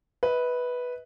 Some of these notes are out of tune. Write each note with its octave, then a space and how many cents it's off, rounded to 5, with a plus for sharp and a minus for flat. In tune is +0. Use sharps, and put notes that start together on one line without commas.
B4 -5 D#5 +45